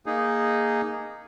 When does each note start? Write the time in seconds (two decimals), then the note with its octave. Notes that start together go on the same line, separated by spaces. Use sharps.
0.06 A#3 D#4 G#4